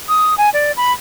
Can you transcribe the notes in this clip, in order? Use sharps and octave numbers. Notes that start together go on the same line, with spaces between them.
D#6
G#5
D5
B5